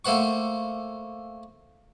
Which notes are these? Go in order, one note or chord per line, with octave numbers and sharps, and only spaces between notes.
A3 A#3 C5 F#5 C#6